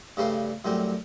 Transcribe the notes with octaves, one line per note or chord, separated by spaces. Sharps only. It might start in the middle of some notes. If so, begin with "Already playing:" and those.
G2 C#3 G3 A3 B4 C6
F#2 A2 G3 C4